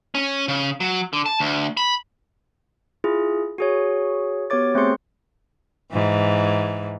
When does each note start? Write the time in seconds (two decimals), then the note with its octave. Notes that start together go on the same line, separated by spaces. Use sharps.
0.15 C#4
0.48 C#3
0.80 F#3
1.13 D3
1.26 A5
1.40 D2
1.77 B5
3.04 E4 F4 G#4
3.58 F#4 G#4 C#5
4.50 B3 F#4 G4 C#5 D6 A6
4.75 A3 C4 G#4 C5 C6 C#7
5.92 G#2 E3